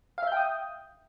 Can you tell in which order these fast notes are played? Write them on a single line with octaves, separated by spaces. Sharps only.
F5 E5 G6 G5 D#6